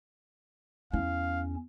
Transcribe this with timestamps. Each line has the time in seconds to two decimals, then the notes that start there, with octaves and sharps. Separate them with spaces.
0.93 E2 C#4 E4 F5